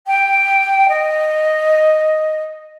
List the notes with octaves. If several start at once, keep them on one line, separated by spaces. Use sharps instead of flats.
G5
D#5